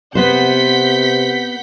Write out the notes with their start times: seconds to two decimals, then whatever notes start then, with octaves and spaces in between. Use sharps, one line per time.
0.15 C3 B3 B4 C5 F#5 G6 B6